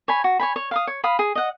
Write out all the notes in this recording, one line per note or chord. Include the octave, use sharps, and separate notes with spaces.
C#5 G#5 B5
F#4
C#5 G#5 B5
C#5
F5 B5 D#6
C#5
F5 B5 D#6
G#4
D#5 F#5